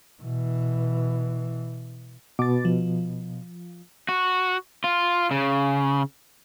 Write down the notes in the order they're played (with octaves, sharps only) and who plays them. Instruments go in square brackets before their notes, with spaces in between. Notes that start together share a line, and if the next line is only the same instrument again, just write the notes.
[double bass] B2 E3
[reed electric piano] B2 [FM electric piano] D6 A6
[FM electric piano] F3
[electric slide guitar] F#4
F4
C#3